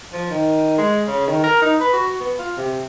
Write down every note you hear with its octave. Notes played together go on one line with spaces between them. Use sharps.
F3
D#3
G#3
C#3
D#3
A#4
D#4
B4
F#4
B3
F4
C3